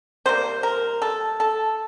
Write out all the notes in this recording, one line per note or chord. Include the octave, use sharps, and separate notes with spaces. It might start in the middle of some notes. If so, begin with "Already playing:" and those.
C3 G3 A#3 C5
A#4
A4
A4